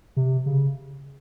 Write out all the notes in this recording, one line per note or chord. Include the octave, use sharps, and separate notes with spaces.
C3
C#3